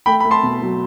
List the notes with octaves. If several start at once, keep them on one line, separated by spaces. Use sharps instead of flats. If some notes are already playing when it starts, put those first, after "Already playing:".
A3 G5 B5
A3 B5
A5 C6
B2
F#3